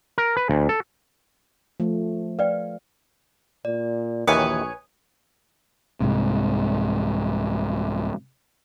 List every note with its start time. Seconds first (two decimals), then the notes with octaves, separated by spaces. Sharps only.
0.18 A#4
0.37 B4
0.49 D2
0.69 A4
1.80 F3 A3
2.39 B4 D5 F5 G5
3.65 A#2 D5
4.27 A#1 D#2 D#3 E3 B4 C#5 G#5 D#6
6.01 C2 G#2 C3